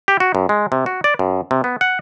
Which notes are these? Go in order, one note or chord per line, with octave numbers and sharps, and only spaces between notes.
G4
F#4
F#2
G#3
C3
F#4
D5
F#2
C3
B3
F#5